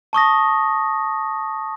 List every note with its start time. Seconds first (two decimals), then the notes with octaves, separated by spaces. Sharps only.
0.13 A5 C#6 D#6 A#6